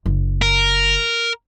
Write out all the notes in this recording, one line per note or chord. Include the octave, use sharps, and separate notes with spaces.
F#1
A#4